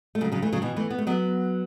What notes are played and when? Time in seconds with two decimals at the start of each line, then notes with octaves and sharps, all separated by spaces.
0.15 A3
0.21 C#3 F#3
0.32 C#3 F#3
0.42 E3 A3
0.52 C#3 F#3
0.62 B2 E3
0.76 E3 A3
0.90 B3
0.98 A3
1.07 F#3 B3